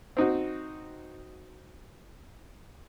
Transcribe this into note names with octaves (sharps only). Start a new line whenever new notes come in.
C4 D#4 F#4